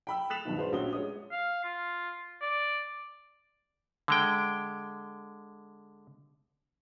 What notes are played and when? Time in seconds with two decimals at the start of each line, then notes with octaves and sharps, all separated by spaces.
0.07 G5 B5 E6
0.30 D#6 F#6 A6 B6 E7 F7
0.45 G2 B2 D#3 F3 B3 D#4
0.58 D4 F#4 G#4 B4 C5 E5
0.72 A#1 C#4 F#4 G4 D#6 G7
0.93 G#3 C#5 D#6
1.31 F5
1.64 F4
2.41 D5
4.08 D3 G#3 G5